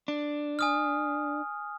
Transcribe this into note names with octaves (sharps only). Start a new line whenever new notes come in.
D4
G#5 D#6 F6